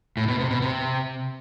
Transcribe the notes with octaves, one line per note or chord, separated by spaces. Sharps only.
A2
B2
C3
B2
C3